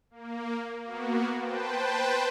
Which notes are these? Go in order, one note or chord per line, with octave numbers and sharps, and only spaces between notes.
A#3
A#3 B3 F#4
B4 C5 G5 A5